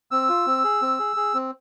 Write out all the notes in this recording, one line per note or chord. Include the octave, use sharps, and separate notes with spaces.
C4 E6
F4
C4
G#4
C4
G#4
G#4
C4